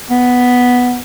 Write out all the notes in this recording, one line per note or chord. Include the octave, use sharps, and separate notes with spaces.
B3